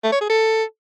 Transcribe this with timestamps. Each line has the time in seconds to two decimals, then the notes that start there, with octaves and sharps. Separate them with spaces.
0.03 A3
0.12 C#5
0.21 G#4
0.29 A4